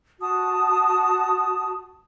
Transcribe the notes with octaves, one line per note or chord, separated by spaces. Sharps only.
F#4 A5 D#6